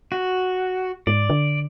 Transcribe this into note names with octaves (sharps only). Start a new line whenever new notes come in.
F#4
G#2 D5
D3